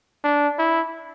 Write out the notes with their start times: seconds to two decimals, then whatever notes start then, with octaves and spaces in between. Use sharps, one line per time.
0.24 D4
0.58 E4